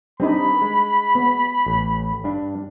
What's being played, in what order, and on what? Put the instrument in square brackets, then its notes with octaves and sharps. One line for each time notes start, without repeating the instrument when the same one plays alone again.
[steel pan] G3 D4 D#4 [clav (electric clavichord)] C4 B4 [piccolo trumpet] B5
[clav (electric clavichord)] G#3
[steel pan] B3
[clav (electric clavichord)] A1
G2 D4